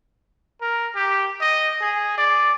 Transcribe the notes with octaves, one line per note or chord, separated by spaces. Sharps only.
A#4
G4
D#5
G#4
D5